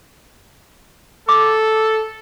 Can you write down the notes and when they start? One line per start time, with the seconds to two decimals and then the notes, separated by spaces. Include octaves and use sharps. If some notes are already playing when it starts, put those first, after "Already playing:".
1.29 A4 D6